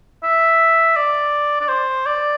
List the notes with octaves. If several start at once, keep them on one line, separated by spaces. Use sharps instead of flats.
E5
D5
D5
C5
D5